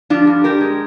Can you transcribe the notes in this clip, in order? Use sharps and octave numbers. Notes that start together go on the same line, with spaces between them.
F3 D4 F4
G2
G2 G4 A#4
G#3